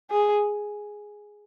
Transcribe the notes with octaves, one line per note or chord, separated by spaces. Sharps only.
G#4